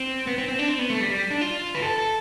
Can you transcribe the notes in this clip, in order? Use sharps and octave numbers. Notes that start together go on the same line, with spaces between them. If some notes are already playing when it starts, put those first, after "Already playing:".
Already playing: C4
B3
C4
C4
D4
C4
B3
A3
G3
G3
D4
F4
B4
A4
A4